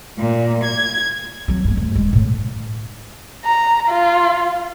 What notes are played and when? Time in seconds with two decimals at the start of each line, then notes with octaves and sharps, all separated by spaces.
0.18 A#2
0.63 G#6
1.48 F#3 C4
1.65 G2 A#3
1.77 D2
1.95 D1 G#3
2.13 A2 D3
3.45 A#5
3.89 F4